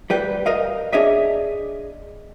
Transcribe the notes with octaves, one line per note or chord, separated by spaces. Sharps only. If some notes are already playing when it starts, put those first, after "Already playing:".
G3 B4 G5
A#4 D#5 F5
D4 G#4 C#5 D#5 E5